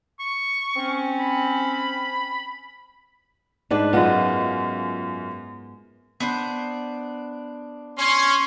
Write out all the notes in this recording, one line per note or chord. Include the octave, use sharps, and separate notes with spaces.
C#6
C4 C#4
B5
G#2 D4 B4
F#2 B3 F4 D#5
B3 D4 C5
C#4 C6 C#6